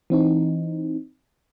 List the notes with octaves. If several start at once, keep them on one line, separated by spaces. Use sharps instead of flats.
E3 C4 D#4